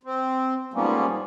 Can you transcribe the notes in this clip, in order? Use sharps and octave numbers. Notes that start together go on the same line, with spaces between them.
C4
G#2 F3 G3 A#3 B3 C#4